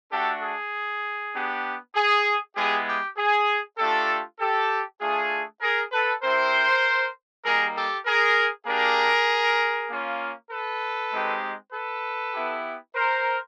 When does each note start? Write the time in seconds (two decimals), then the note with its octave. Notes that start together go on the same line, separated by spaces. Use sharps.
0.11 A3 D4 F#4 G4 A4
0.42 G#4
1.34 B3 D4 G4
1.95 G#4
2.56 G#3 B3 E4 G4 G#4
2.87 G4
3.17 G#4
3.78 A3 D4 F4 G4 A4
4.39 G4 A4
5.00 A3 D4 F4 G#4
5.61 G#4 A#4
5.92 A4 B4
6.22 C4 E4 G4 A#4 C5
7.44 G3 A#3 D#4 G#4 A#4
7.75 G4 A4
8.06 G#4 A#4
8.66 A#3 D4 G4 G#4 A#4
9.89 A#3 C#4 F4
10.50 A4 B4
11.11 G#3 C4 D#4 G4
11.72 A4 B4
12.34 B3 E4 G4
12.95 A#4 C5